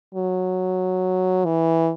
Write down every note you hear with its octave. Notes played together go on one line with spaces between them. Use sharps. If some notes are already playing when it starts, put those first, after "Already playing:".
F#3
E3